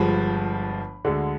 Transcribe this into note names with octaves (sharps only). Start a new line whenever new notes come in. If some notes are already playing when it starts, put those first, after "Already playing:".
Already playing: G1 G2 F3 G#3 B5
D2 D3 G#3